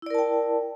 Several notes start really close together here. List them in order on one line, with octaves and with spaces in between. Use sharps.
E4 D5 A#4 A5 G5